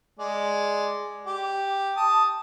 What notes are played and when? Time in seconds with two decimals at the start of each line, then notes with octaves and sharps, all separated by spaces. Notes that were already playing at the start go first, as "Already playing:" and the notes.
0.19 G#3 D5
1.27 G4 D6
1.97 A5 D#6